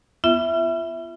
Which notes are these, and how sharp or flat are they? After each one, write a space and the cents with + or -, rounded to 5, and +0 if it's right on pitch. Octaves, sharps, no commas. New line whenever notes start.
B3 +0 F4 -40 E5 +0